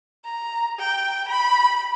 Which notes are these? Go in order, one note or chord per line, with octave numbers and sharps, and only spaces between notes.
A#5
G5
B5